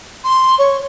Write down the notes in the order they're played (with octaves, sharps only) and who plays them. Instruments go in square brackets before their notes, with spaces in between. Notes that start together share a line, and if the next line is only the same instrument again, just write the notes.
[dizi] C6
[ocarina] C#5 [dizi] C#6